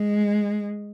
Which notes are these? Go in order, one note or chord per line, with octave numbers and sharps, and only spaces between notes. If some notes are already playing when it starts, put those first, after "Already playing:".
Already playing: G#3